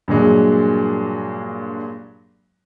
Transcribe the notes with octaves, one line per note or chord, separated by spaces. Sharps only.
G2 A#2 F#3 G#3